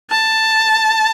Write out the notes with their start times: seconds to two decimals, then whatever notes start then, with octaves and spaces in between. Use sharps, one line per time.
0.11 A5